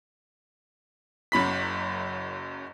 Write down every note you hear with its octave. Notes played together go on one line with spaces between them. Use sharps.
F#1 F#2 B5 B6